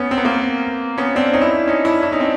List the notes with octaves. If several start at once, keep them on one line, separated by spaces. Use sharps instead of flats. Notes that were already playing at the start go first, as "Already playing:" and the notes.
Already playing: B3 C#4
C4
B3
A#3 C4
B3 C#4
C4 D4
C#4 D#4
D4 E4
C#4 D#4
D4 E4
D4 E4
C#4 D#4
C4 D4